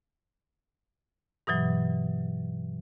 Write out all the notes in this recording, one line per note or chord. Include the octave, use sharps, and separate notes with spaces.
G2 B2 E3 F#3